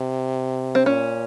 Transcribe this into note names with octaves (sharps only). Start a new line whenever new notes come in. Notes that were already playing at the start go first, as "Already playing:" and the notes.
Already playing: C3
C4
A#2 C#4